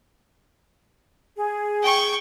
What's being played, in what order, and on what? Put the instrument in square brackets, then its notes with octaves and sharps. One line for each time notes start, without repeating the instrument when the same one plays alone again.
[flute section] G#4
[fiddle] G5 C#6